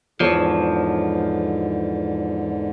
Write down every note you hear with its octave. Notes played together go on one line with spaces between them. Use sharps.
E2 G#2 D3 F3 A4 C#5